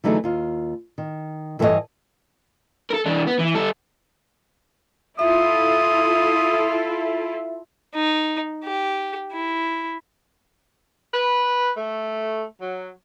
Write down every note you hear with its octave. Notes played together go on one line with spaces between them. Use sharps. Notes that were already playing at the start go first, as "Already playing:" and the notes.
D3 E3 F#3 A3 D#4 G#4
D#2 F4
D#3
G2 E3 A4 B4 C#5 D#5
A4 A#4
E3 D4
B3
E3
G3 A4
E4 F4 A4 E5 D#6
D#4
G4
E4
B4
A3
F#3